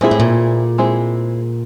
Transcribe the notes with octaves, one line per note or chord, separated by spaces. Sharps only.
A#2 G#3 C4 E4 G#4
A2
A#2
G#3 C4 E4 G#4